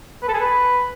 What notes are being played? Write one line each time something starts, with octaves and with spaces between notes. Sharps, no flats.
B4
A4
G#4
B4